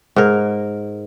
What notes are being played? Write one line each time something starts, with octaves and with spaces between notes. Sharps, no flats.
G#2 A#4